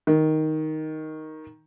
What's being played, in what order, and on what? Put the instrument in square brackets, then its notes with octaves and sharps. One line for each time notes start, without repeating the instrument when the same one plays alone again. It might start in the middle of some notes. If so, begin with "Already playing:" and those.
[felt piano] D#3